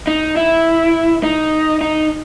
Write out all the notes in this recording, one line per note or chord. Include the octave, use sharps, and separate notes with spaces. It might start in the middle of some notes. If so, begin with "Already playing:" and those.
D#4
E4
D#4
D#4